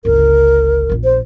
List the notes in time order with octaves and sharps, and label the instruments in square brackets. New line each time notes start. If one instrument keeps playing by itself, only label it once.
[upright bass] G1 C#2 [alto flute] A#4
[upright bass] A#1 E2
[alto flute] C5